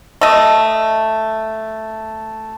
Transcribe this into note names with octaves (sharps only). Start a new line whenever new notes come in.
A3 D#5